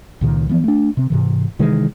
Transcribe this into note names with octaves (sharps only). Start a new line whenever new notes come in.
C#2 A#2 D#3
E3 F3 B3
A3 D4
C3 C4
G#2 C3 E3
C3 D#3 E3 G#3